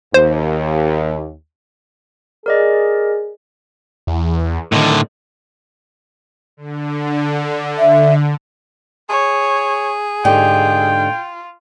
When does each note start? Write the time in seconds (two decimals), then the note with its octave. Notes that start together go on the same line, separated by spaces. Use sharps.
0.14 D#2 C5
2.46 G#4 A#4 D5 D#5
4.07 E2
4.72 A2 D3 D#3
6.57 D3
7.78 E5
9.09 G#4 C#5
10.25 G#2 D3 F4 G4 G5